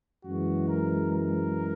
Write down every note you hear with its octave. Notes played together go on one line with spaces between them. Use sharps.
F#2 E3 G#3 F#4
A#4
A#4